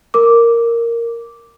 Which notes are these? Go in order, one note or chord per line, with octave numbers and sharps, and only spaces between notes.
A#4 D6